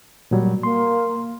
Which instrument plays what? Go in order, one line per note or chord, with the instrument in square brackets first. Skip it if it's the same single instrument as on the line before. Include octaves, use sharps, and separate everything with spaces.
[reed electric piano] A#2 F#3 G3
[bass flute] A#3 [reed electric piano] C6